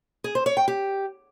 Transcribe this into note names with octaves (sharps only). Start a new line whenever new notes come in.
G#4
C5
C#5
G5
G4